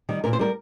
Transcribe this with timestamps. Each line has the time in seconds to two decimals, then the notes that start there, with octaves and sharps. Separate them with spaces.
0.09 D#3 G3
0.24 A#2 A#4
0.33 C5
0.39 G3 A#4